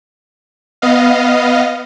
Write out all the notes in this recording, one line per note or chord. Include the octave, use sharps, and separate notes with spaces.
B3 D#5 F5